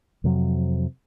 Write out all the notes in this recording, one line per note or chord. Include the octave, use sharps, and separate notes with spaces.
F2 C3 F#3